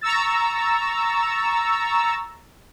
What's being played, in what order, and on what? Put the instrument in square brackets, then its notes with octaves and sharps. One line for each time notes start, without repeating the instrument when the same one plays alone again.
[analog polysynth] A#5 C#6 E6 A6